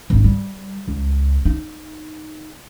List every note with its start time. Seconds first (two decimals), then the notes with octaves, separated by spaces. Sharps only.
0.10 G#1 D#4
0.24 G3
0.88 C#2
1.45 D#4